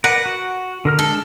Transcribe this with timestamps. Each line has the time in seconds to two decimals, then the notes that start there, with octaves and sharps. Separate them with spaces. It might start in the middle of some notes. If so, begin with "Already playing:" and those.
0.04 A#4 B4 D5 F#5
0.26 F#4
0.85 D3 A#4 F6
0.99 G#3 D4 A4 F6